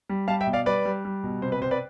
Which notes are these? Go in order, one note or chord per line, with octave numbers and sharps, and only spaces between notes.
G3
G3 F5 A5
E5 G5
B2
D5 F5
G3 B4 D5
G3
G3
B2
C3 C5
B4
C3 C5
B4 D5